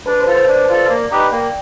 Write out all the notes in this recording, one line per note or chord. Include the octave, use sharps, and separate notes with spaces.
D4 B4
C5
F4 A4
C5
D4 D5
F4 A4
A#3
D#4 G4 B4
A#3 G5